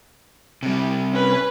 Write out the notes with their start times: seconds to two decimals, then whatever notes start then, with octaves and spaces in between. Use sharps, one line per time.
0.63 C3 G3
1.13 C#4 B4